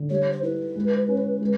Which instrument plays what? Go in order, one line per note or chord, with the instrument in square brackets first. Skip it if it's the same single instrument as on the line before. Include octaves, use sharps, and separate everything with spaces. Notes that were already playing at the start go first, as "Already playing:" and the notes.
Already playing: [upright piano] D3
[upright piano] G3 [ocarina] C#5
[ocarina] C5
[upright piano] E4 [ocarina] B4
[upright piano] G#3
C#4
G#3